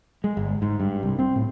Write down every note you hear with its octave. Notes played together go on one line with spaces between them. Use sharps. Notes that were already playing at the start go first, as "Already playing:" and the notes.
G#3
G1
G#2
G2
C2
C4
A2